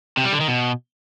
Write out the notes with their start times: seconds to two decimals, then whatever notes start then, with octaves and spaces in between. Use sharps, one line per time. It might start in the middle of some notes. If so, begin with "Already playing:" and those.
0.17 C3
0.25 G3
0.33 D3
0.40 D#3
0.48 B2